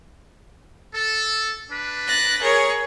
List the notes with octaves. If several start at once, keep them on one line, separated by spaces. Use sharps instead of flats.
A4
D4 B4
F#6 A6 A#6
G#4 A#4 C#5